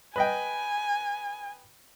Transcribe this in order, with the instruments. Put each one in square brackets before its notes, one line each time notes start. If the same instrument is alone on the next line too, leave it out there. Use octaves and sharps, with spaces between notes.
[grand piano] B4 D#5 G5 [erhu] G#5